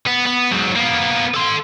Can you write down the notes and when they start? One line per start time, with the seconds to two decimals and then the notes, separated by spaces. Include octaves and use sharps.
0.06 B3
0.26 B3
0.51 G#2 F#3
0.76 A#3 B3
1.34 A4 C6